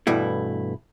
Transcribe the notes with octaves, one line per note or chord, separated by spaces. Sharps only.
G2 B2 E3 A3 E4